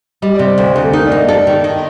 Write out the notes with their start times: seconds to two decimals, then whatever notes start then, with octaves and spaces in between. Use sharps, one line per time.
0.22 G3 D#5
0.34 C3 D5
0.46 C5
0.58 D2
0.76 D2
0.84 A4
0.93 D#4 A#4
1.05 D5
1.12 A#3
1.17 D#5
1.29 A4 D5
1.47 D#3
1.64 D#3 D#5